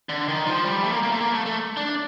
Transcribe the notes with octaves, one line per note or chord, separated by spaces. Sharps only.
D3
D#3
F3
G3
A3
A#3
A#3
A3
A#3
A3
A3
D4